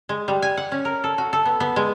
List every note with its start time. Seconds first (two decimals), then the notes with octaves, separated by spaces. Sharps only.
0.09 G#3
0.28 G3
0.42 G#5
0.57 F#5
0.72 C#4
0.85 A#4
1.04 A4
1.18 F#4
1.33 A4
1.45 B3
1.60 B3
1.76 G#3